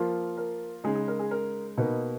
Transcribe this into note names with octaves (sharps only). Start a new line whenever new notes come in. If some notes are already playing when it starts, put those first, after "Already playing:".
Already playing: F3 A#3 F4
A#4
C#3 G#3 D#4 G#4
G#4
A#4
G#4
A#4
B2 A#3 D#4 B4